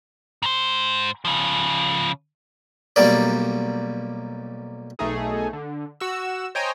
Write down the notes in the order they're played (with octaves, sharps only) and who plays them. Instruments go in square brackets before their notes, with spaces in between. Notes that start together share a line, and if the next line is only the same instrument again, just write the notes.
[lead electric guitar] G#2 C5
C#3 F3
[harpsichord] B1 G3 A#3 D5
[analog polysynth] B1 A3 D#4 G#4
D3
F#4 E6
C5 C#5 D#5 G5 G#5 A#5